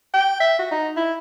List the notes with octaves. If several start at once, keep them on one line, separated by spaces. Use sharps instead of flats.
G5
E5
F#4
D#4
E4